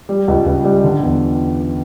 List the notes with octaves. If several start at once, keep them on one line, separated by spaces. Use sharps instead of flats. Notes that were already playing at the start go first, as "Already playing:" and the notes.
G3
C#2
C#2
G3
D3
E2